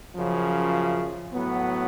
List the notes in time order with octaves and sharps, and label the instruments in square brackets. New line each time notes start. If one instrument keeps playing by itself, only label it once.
[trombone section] F#2 C#3 F3
A2 F#3 B3